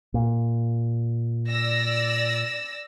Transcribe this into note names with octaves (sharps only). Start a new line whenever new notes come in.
A#2
D5 E6 A#6